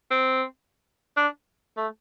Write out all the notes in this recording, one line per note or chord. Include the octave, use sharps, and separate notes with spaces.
C4
D4
A3